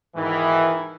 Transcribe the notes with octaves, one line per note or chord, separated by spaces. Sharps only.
G#2 B2 D#3 E3